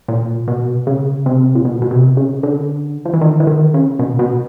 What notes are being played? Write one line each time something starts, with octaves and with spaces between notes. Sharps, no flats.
A#2
B2
C#3
C3
A#2
B2
B2
C3
C#3
D3
F3
E3
D#3
E3
D#3
C#3
B2
B2